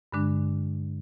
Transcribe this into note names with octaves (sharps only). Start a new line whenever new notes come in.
G2 D3 G#3 D4